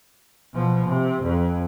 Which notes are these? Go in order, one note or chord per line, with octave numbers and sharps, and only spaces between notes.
B2 F3
C3
F2